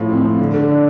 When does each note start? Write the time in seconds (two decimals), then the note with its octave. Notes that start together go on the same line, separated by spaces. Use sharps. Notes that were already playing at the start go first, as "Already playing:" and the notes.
Already playing: A2 F3
0.09 C4
0.24 F3
0.38 D3
0.54 D3
0.69 D4